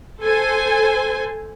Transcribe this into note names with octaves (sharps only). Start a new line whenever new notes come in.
A4 C5 G#5